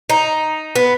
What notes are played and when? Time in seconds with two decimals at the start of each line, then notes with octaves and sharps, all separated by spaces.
0.10 D#4
0.75 B3